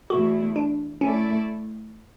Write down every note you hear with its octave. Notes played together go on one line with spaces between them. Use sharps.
E2 B2 A3 E4 F#4
D4
A3 C#4 E4 A4 D5